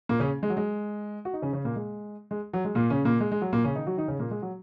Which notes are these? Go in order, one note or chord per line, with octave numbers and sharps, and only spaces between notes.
A#2 A#3
C#3 C#4
G#3
F#3
G#3
F#4
D#4
C#3 C#4
C#3 C#4
A#2 A#3
G#3
G#3
F#3
G#3
A#2 A#3
C#3 C#4
A#2 A#3
G#3
G#3
F#3
A#2 A#3
C#3 C#4
D#3 D#4
F#3 F#4
D#3 D#4
C#3 C#4
A#2 A#3
G#3
F#3